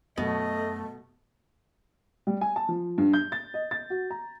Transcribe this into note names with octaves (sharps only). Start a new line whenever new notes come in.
F#2 B2 A3 D#5
G3
G#5
A5
F3
G2
G6
A6
D#5
A6
F#4
A#5